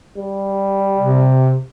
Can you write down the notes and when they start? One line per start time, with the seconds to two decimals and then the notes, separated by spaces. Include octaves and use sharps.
0.17 G3
0.99 C3